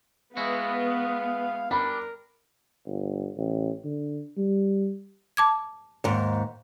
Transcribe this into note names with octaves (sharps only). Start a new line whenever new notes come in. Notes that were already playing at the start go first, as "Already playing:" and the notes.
G#3 B3 E4 F#4 F5
G3 D4 A#4 B5
G1
A1
D3
G3
A5 D6 G#6
D#2 G#2